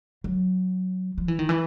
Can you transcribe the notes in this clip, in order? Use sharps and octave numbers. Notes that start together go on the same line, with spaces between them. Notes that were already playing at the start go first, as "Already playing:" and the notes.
F#3
F3
E3
D#3
E3